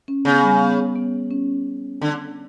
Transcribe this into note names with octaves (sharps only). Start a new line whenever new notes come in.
C#4
C#3 B3
G3
B3
B3
C#4
D3